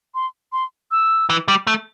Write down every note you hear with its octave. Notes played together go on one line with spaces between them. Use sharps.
C6
C6
E6
E3
G3
A3